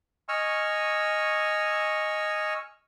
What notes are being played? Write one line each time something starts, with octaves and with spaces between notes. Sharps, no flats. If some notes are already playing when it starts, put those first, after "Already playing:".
D#5 G#5 C#6 E6 F6